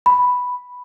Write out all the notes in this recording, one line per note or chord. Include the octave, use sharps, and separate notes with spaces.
B5